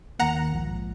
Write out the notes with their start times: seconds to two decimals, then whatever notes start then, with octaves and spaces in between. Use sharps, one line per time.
0.19 D#2 D#3 A#3 F#5 A#5
0.52 A#1 G#2 F3